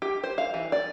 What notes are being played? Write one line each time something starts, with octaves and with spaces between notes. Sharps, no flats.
G4
C5
F5
E3
D5